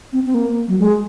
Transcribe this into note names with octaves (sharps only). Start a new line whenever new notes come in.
C4
C4
A#3
F#3
G#3